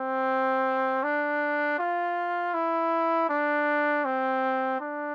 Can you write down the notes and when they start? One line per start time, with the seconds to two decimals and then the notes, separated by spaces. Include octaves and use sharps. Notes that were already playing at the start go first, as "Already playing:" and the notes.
Already playing: C4
1.03 D4
1.79 F4
2.54 E4
3.29 D4
4.05 C4
4.80 D4